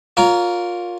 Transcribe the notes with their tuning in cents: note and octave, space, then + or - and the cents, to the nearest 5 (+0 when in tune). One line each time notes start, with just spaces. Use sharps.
F4 +20 A#4 +0 C#5 +35